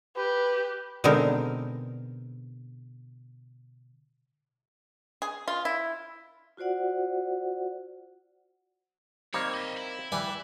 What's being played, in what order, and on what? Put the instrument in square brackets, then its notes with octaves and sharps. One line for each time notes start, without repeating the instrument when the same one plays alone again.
[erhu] G4 [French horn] B4
[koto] B2 D3 G#3 C4 D#4 A#4
[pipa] G#4
F4
E4
[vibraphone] F4 F#4 C5 D5 F#5
[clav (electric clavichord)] D#3 G3 A#3 [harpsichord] C4 [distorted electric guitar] C#5
[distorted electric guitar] D#5 E5
E4
[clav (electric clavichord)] E3 [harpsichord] G3 B4 G#5